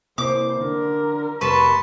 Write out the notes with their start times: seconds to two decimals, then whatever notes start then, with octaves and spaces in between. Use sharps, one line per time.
0.18 C3 A#3 E4 C5 D6
0.61 D3 D4 A#4
1.41 F2 C3 G3 B4 A5 C6 C#6